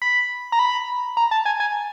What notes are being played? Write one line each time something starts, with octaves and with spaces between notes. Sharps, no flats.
B5
A#5
B5
A#5
A5
G#5
G#5